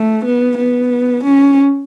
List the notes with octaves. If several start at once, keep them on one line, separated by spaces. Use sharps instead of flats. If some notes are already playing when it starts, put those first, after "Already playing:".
Already playing: A3
B3
B3
C#4